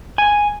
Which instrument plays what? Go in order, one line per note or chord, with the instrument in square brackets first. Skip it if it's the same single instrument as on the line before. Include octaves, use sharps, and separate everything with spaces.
[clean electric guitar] G#5